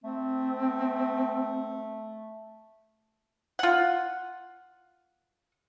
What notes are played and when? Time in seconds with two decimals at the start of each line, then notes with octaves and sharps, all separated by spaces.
0.04 A3 C4
3.59 F4 F#5